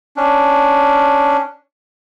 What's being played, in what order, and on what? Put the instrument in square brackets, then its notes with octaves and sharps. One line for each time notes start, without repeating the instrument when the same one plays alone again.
[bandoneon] C#4 D4